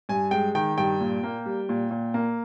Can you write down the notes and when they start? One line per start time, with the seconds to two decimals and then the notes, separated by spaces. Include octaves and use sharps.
0.09 G2 G#5
0.31 G#3 G5
0.55 D#3 G5
0.78 G2 G5
1.00 A#2
1.23 A#3
1.46 G3
1.69 A#2
1.91 A#2
2.14 A#3